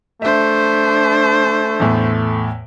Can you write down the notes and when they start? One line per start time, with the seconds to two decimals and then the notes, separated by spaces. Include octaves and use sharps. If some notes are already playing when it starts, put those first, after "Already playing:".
0.22 A3 D4 C5 E5
1.80 E2 A2